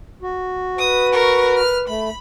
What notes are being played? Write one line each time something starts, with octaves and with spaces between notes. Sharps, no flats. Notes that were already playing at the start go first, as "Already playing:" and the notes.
F#4
B4 D#6
A#4 C#6
F6
A3 B5